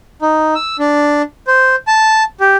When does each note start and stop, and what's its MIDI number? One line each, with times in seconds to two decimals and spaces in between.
0.22 0.54 63
0.55 0.77 88
0.79 1.22 62
1.47 1.76 72
1.87 2.23 81
2.40 2.57 67